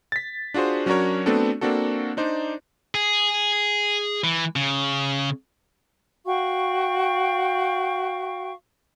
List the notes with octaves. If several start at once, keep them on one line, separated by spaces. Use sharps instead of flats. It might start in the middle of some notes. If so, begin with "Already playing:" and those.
A6 B6
D4 F4 F#4 G#4 C5
F#3 C#4 D4 F#4 A#4 C#5
A3 B3 C4 D4 F#4 A4
A#3 C4 D4 F#4 A4
D4 D#4 C5 D5
G#4
E3
C#3
F#4 F5 G5 C#6